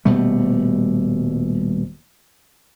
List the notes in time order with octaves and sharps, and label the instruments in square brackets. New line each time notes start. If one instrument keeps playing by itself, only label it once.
[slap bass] D#1 B2 G3 A3